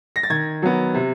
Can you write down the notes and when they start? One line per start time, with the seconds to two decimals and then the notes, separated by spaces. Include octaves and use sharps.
0.16 A#6
0.23 A6
0.30 D#3 G#6
0.62 F#3 B3
0.94 C3